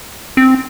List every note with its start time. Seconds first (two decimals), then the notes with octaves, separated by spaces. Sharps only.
0.37 C4